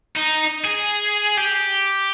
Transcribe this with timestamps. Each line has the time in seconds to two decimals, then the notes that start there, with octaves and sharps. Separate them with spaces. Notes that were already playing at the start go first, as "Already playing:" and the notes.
0.16 D#4
0.64 G#4
1.37 G4